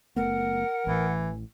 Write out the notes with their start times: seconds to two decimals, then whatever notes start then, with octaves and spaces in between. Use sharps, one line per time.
0.16 F#1 A3 B3 A#4 F#5
0.87 A1 A2 E3